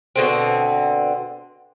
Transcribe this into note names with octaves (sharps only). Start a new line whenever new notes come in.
B2 D3 C4